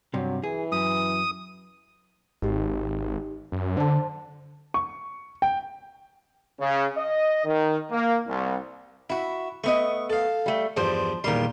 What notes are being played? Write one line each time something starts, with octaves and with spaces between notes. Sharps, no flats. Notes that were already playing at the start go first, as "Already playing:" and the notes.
G2 C3 F#3
E3 G#4
F#2 D#6
G#1 D#4 G4
F#2
D3 C5 A5
C#6
G5
C#3
D#5
D#3
A#3
C2
E4 F#4 E5
A3 B3 D#5 C#6
A4 F5
G3 A3
E2 G2 F3 G3 C5
E2 A#2 D#3 G3 C6